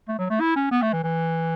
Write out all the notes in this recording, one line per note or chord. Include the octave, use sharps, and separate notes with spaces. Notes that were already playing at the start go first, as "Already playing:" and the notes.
A3
F#3
A3
E4
C#4
B3
A3
E3
E3